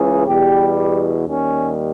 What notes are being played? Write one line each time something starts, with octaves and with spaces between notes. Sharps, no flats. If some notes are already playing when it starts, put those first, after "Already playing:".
Already playing: C#2 C#3 E3 G#4
E2 B2 G3 G4
D#2 D#3 G3 C#4